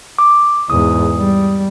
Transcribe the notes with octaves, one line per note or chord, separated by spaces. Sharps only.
D6
E2 G#2 D#6
G3